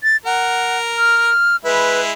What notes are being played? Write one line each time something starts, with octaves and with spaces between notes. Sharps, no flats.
A6
A#4 F#5
F6
G#3 E4 B4